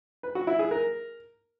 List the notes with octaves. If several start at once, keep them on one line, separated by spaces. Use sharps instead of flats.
B4
F#4
E4
G#4
A#4